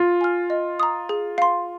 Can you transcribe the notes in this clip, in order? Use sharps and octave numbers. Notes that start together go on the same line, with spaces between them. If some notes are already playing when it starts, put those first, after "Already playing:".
Already playing: F4
G#5 F6
D#5
A#5 D#6
G#4
F5 C6